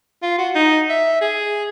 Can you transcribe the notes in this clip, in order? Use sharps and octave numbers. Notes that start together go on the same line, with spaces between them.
F4
F#4
D#4
E5
G#4